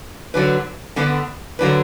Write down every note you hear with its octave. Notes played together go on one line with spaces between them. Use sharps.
D3 F#3 D4 B4
D3 B3 D4 B4
D3 F#3 D4 B4